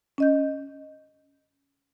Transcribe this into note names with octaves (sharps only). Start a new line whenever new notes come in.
C#4 D#5 G6